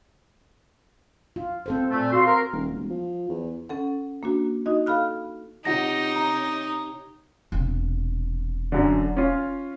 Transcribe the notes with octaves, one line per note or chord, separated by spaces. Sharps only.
F4
C4 A4 C5
A#2 A3
F#4 F5 C6
A#4
D#1
E1
F3
E2
C#4 A4 F#5
A#3 D4 F#4
D#4 F#4 D#5
A4 F5 B5 F6 F#6
C3 D#4 F4 G4 C#5 F#5 A#6
A#5
E1 C3
F#2 D3
C#4 F4